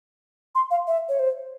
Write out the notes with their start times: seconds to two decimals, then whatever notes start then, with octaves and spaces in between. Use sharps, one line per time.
0.55 C6
0.71 F5
0.87 E5
1.09 C#5
1.19 C5